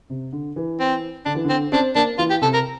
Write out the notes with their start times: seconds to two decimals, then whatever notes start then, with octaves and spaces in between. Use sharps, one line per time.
0.10 C3
0.33 D3
0.56 E3
0.80 C4
1.25 D3 D4
1.35 E3
1.44 D3 C4
1.72 C4 D4
1.95 A#3 D4
2.18 E3 F4
2.30 G4
2.42 C3 A4
2.54 A#4